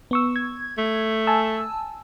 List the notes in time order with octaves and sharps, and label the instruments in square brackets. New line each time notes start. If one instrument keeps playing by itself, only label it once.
[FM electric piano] B3 C#6 E6
G#6
[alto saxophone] A3
[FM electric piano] G#5 A5 E6